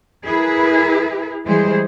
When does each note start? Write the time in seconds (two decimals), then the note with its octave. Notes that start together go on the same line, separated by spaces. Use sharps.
0.24 E4 G#4 A#4 B4
1.45 E3 G3 G#3 G#4 C5